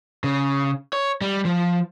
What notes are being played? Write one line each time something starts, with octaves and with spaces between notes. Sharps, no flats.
C#3
C#5
G3
F3